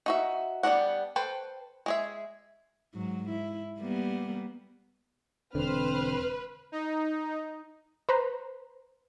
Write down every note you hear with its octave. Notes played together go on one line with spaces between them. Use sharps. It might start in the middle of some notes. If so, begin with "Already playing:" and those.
D#4 F#4 E5
G3 B3 D4 F#4 F#5
A4 B4 C5 G5
G#3 G#4 E5
G#2 F#3
E4
G3 A#3 B3
E1 D3 C4 B4 C5 F6
D#4
B4 C5 A#5 C6